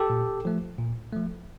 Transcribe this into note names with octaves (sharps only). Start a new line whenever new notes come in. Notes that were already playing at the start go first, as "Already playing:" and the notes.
Already playing: G4 A4
A#2
F3 A3
A#2
F3 A3